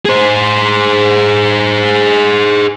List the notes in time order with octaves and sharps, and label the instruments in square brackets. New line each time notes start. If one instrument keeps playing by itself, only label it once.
[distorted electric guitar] G#4 C5